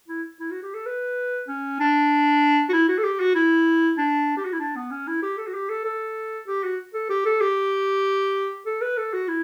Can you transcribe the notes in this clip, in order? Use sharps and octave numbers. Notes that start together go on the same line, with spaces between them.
E4
E4
F#4
G4
A4
B4
C#4
D4
F#4
E4
F#4
A4
G4
F#4
E4
D4
G4
F#4
E4
D4
B3
C#4
E4
G4
A4
F#4
G4
A4
A4
G4
F#4
A4
G4
A4
G4
A4
B4
A4
F#4
E4